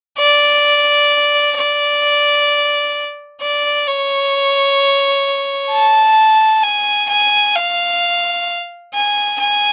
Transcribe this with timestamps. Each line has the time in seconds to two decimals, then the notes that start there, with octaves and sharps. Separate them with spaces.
0.18 D5
1.57 D5
3.42 D5
3.87 C#5
5.71 A5
6.64 G#5
7.10 G#5
7.55 F5
8.94 G#5
9.40 G#5